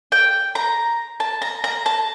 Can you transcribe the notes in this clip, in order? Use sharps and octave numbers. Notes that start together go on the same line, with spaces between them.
G5
A#5
A5
A#5
A#5
A5